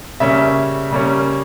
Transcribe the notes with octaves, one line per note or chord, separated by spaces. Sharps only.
C#3 G3 A#3 C#4 E5
C#3 G3 A#3 C#4